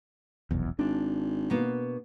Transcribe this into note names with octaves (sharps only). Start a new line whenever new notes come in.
F1 B1 E2
G#1 D4
B2 A#3 B3